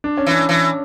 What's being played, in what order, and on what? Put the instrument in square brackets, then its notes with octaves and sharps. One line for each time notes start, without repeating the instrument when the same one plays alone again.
[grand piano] D4
C#4
[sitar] E3 [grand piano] D4
[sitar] E3